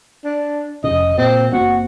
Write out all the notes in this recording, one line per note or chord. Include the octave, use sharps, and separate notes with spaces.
D4
F1 C#3 D#5
A#2 C4
F#1 A#3 C4 F#4